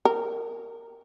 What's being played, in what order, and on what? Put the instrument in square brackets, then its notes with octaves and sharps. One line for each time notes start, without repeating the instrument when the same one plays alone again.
[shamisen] A#4